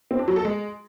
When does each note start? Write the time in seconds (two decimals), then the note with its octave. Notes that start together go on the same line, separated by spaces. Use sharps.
0.11 C4
0.19 D4
0.28 F#3
0.36 A4
0.45 G#3